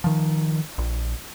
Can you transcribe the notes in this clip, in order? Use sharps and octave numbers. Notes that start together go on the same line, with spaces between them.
D#3 F3
A#1